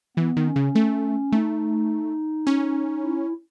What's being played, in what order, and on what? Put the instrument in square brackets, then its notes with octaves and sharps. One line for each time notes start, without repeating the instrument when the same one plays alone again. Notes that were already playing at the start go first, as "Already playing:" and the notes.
[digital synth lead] E3 [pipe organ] B3
[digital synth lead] D#3
[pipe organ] C#4
[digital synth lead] C#3
A3
[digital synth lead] A3 [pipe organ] D#4
[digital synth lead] C#4
[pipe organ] E4